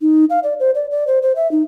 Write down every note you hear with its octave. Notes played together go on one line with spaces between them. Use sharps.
D#4
F5
D5
C5
D5
D5
C5
C5
E5
D#4